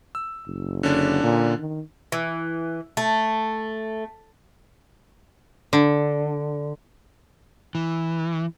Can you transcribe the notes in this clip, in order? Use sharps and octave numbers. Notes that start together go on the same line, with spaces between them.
E6
F#1
D3 C#4 D4
A#2
D#3
E3
A3
D3
E3